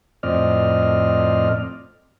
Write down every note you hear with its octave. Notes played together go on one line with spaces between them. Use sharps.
F2 A2 C4 D5 D#5 F6